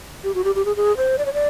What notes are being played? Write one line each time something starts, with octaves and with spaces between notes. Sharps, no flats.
G4
F#4
G4
G4
G#4
G#4
C5
D5
C#5
D5